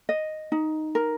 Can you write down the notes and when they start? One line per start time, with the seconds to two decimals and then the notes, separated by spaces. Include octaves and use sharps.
0.09 D#5
0.52 D#4
0.95 A#4